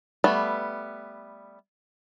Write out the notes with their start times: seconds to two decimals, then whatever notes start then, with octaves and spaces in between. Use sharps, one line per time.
0.24 G3 A3 B3